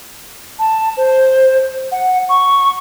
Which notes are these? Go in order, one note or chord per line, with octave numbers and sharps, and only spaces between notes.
A5
C5
F#5
C#6